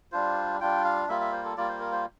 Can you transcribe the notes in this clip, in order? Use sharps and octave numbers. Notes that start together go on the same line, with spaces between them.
G3 D4 F4 C5
G3 D4 F4 G5
F5
G3 A#3 F4 E5
E5
C5
A4
G3 A#3 F4 D5
C5
A#4
C5